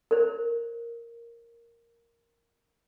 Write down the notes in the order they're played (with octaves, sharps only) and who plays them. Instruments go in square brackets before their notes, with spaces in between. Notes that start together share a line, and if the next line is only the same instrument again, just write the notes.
[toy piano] A#4 C5